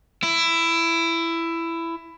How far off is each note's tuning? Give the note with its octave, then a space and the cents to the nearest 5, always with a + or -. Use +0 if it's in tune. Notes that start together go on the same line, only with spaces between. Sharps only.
E4 +15